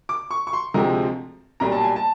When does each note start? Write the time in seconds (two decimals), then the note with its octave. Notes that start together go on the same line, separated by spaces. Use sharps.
0.09 D6
0.31 C#6
0.47 C#6
0.53 C6
0.74 D2 C3 F3 G#3 C4 A#5
1.60 B1 A#2 G3 A#5
1.72 A5
1.84 G#5
1.96 A5